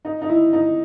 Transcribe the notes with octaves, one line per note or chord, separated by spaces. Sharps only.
D#4
D#4
E4
D#4